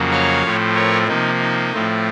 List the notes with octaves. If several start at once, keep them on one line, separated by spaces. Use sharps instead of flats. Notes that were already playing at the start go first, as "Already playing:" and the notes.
Already playing: F2 C#3 F#3 A#3
C#5 F5
A2 F3 A3 C4
A#4 C#5
C3 F3 A#3 D#4
D#4
A2 F3 A3 C4